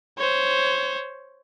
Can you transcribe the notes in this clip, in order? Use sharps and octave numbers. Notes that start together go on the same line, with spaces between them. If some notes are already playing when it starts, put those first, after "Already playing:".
C5 C#5